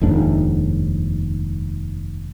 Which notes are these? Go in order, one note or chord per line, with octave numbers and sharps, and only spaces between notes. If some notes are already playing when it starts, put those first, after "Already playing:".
F1 D#2 G#2 D4